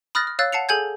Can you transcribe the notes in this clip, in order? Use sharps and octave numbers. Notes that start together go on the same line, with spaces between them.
B5 D#6 F6 F#6 A6 A#6
F6
C#5 F5 E6 F#6 A6
F#5 A5 C7 C#7 F7
G#4 A4 G#5 G6 G#6